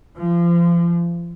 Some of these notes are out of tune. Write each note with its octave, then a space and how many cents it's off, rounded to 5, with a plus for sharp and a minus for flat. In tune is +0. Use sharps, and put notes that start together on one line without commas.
F3 -30